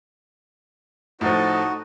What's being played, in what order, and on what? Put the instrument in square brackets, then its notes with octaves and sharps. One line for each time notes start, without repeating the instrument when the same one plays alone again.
[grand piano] A2 F3 [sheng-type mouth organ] D#4 F#4 [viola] A4 D#5